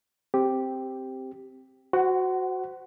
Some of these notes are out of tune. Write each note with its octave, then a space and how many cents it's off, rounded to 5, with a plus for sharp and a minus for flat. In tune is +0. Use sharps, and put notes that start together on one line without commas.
C4 +0 G4 +0
F#4 +0 C5 -20 F#5 +25